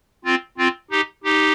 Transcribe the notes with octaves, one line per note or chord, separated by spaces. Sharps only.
C4 F4
C4 F4
D#4 G4
D#4 G4